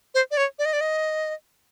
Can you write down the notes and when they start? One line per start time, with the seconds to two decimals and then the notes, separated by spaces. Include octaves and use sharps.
0.15 C5
0.31 D5
0.37 C#5
0.59 D5
0.65 D#5
0.73 D5
0.81 D#5